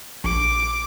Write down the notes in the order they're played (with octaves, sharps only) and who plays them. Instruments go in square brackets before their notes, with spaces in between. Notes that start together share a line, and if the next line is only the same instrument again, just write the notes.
[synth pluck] A#1 [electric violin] D6